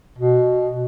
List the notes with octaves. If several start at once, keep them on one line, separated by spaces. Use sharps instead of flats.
B2